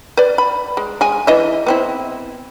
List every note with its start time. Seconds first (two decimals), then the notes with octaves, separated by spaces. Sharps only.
0.17 B4 D5
0.38 B5
0.77 G#3
1.01 G#3 G#5
1.27 E3 D#5 E5
1.67 B3 C4 E4